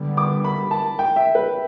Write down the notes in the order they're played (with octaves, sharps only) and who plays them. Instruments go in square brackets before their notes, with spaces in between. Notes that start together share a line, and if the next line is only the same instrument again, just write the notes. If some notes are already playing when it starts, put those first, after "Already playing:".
Already playing: [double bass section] D3 G3 B3
[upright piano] D6
B5
A5
G5
E5
B4